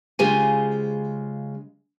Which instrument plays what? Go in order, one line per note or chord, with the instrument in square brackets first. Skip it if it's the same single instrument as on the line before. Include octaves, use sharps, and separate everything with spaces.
[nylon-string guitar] C#3 G#3 F4 G4 C5 G#5